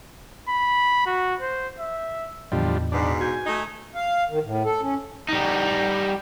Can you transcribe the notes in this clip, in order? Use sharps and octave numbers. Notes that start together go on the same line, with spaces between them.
B5
F#4
C5
E5
E2 A2 D3 F3 G3 D#5
G#2 B2 D4
F#4 G#5 G6
A3 D#4
F5
D#3
A2
A4
C#4
G3 D#4